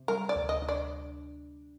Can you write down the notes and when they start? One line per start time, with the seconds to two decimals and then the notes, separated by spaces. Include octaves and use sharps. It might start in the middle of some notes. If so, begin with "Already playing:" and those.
Already playing: C3
0.08 G3 A#4
0.29 D5
0.36 D2
0.49 D#5
0.62 D4
0.69 D5